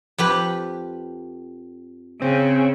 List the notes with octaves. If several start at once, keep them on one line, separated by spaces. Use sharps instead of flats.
F2 G4 B4
C#3 C4